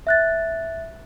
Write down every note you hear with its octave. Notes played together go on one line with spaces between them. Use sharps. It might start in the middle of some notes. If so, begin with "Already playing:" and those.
E5 F#6 A6